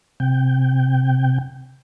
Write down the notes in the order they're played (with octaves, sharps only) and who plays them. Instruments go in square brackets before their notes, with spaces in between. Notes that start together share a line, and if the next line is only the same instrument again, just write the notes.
[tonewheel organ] C3 G5